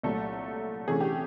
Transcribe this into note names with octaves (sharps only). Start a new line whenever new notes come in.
C2 A#2 F#3 A3 A4
C3 E3 A3 C#4 G#4
G4